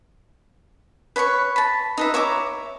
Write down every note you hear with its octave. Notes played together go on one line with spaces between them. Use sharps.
B4 C#5 B5 C#6
A5 B5
D#4 B4 E5
C#5 E5 A#5 D6